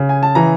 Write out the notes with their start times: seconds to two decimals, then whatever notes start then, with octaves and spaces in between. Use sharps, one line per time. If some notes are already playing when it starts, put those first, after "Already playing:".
Already playing: C#3
0.09 G#5
0.23 A5
0.35 E3 A#5